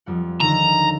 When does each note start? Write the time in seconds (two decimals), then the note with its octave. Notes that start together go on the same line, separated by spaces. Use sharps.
0.06 F2 G3 F#5
0.40 D#2 D3 D#3 A#5